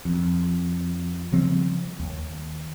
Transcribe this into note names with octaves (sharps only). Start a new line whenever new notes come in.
F2
C#3 F3 G3 C4
D#2